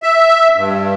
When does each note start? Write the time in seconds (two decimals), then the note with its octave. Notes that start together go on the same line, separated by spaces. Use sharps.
0.03 E5
0.57 G2